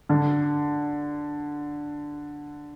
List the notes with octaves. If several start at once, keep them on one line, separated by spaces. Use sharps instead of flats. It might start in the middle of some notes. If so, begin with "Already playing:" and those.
D3